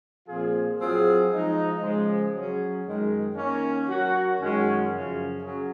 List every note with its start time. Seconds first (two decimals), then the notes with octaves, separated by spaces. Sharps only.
0.27 A#2 F3 C4 F4 G#4
0.79 F#3 C4 F4 G#4
1.31 F3 G#3 D#4
1.82 C#3 F3 G#3
2.33 F#3 C#4 G#4
2.85 F#2 D#3 G#3
3.36 D#3 A#3 C#4
3.88 F#3 C#4 F#4 A#4
4.39 F#2 D#3 G#3 C#4 F#4
4.90 F#2 C#3 F3
5.41 F#3 C#4 G#4